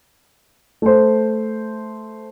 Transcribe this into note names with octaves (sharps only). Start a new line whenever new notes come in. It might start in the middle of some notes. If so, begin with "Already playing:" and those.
A3 C5